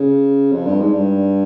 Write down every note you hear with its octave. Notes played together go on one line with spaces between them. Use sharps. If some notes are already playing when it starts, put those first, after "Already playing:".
Already playing: C#3
F2
G2
G#2
G2